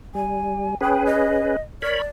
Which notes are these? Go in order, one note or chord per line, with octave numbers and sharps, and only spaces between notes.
G3 G#5
C#4 G#4 B4 G5
D#5
A#4 C#5 D5 B5